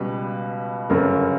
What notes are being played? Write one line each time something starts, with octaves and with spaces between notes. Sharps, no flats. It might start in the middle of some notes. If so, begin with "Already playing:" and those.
Already playing: C#2 B2 G3 B4
G1 F#2 C#3 A#4